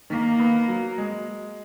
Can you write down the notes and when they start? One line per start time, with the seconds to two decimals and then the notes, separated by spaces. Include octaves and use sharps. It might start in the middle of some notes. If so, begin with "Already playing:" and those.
0.10 D#3 A#3
0.40 B3
0.68 F#3
0.98 G#3